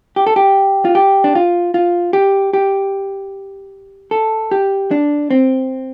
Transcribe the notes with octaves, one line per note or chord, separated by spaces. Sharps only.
G4
A4
G4
F4
G4
D4
F4
F4
G4
G4
A4
G4
D4
C4